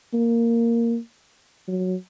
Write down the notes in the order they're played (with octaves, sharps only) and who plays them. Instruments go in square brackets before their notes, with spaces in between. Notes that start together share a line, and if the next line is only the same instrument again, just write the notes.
[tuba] A#3
F#3